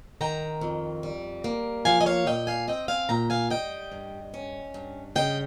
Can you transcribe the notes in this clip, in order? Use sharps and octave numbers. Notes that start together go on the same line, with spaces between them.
D#3 G5 A#5
F2
G3
A#3
F3 F5 G#5
D#5
C#5 F5
A#2 D#5 G5
F5 G#5
C4 D#5 G5
F5 G#5
A#2 G5 A#5
F5 G#5
G3 D#5 G5
G2
C#4
G2
C#3 D#5 G5